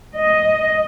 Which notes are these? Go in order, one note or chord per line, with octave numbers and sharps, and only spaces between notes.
D#5